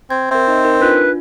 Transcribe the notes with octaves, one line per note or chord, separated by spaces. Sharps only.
C4 G#6
C4 A#4 E5
D#4 D#5
D#4 A#4
D4 F4 B4